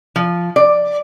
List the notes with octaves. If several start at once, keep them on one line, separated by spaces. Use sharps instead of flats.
F3
D5